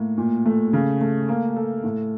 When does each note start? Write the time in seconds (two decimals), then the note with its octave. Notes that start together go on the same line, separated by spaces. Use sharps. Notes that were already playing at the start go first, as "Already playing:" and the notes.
Already playing: A2 A#3
0.18 A#2
0.45 A3
0.73 C#3
1.01 A3
1.28 A#3
1.56 A4
1.84 A2